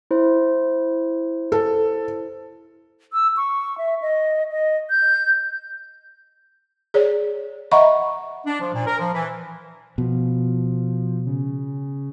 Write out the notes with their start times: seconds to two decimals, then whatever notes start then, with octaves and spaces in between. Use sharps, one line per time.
0.11 E4 C5
1.52 A4
3.13 E6
3.37 C#6
3.78 E5
4.02 D#5
4.51 D#5
4.90 G6
6.94 G#4 C#5 D5
7.71 D#5 E5 F#5 A#5 B5 C#6
8.46 D4
8.61 F3
8.74 A#2
8.86 A#4
8.99 F3
9.13 E3
9.98 B2 F3
11.26 C#3